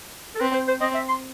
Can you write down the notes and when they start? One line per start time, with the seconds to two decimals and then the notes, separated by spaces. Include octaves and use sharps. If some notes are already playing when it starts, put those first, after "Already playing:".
0.35 A4
0.40 C4 B4
0.53 C5
0.68 C5
0.80 C4 D#5
0.94 E5
1.09 C6